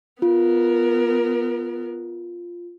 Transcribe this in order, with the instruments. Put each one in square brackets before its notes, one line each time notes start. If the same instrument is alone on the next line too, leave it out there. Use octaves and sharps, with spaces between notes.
[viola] B3 A#4 [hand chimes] F4